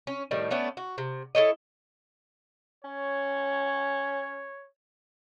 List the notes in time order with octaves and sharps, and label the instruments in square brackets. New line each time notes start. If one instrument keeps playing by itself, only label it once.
[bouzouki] C#4
A2 D#3 G3
A3 B3 C#4 D4
F#4
C3
E4 A4 C#5 D#5
[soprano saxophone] C#4 [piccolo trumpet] C#5